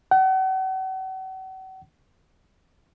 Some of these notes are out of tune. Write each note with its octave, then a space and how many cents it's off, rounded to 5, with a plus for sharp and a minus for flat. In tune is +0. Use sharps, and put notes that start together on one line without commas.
F#5 +40